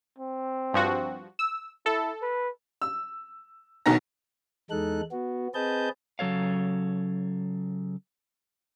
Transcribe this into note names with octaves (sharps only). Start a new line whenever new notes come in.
C4
G2 F3 F#4
E6
E4 A4
B4
E6
B1 B2 D#3 B3 A#5 A#6
E2 G#3 D#4 A4 F#6
B3 F#4
C4 G#4 B4 D#5 A5 G6
C#3 F#3 A4 C#5 F5